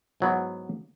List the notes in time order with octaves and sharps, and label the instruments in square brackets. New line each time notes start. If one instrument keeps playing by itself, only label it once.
[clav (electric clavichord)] G#2 F#3 B3 E4